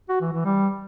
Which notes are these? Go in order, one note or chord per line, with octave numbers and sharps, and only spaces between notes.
F#4
E3
E3
G3